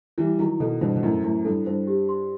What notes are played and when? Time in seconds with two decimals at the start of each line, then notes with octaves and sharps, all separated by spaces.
0.18 E3 G3 E4
0.39 D#3 F#3 E4
0.60 B2 D#3 A4
0.81 G2 B2 C5
0.96 B2
1.03 F#2 A2 E4
1.24 F#2 A2 E4
1.45 G2 A4
1.66 G2 C5
1.87 G4
2.09 C6